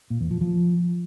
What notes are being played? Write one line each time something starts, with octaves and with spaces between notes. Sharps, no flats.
A#2
E2
F3
F3